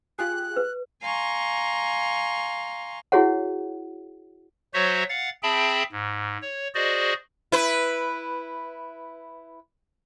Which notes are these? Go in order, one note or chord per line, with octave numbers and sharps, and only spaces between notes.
F4 G4 G#4 F#6
B4
F5 G#5 A#5 C6 C#6
E4 F#4 G#4 C#5 F#5
F#3 F#4 C5 C#5 E5
F5 F#5 A6
C4 G#4 E5 G5 A5 B5
G#2
C#5
F#4 G#4 C5 D5 D#5
E4 B4